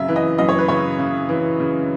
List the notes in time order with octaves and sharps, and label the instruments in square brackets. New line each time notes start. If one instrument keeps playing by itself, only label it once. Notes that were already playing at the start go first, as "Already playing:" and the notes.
Already playing: [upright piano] F#2 C#3 E5
E3
D#5
F#2 D#5
C#5
B4
C#3 C#5
C#3
E3
C#3